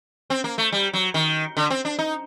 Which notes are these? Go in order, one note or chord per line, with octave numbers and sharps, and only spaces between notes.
C4
A#3
A3
G3
F#3
D#3
D3
C4
D4
D#4